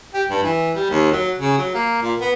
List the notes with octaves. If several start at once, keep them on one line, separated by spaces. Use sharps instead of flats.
G4
G2
E3
G3
D#2
F#3
C#3
F#3
A#3
A#2
B3